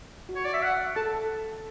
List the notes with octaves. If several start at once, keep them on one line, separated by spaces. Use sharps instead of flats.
F#4
C#5
D5
E5
F#5
A4 A5